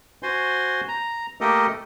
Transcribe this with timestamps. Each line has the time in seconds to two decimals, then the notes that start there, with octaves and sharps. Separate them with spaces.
0.23 F#4 C5 G#5 C6
0.88 A#5
1.41 A3 A#3 G4 A4 A#4 D#5